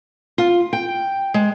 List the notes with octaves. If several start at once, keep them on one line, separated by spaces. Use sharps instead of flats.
F4
G5
G#3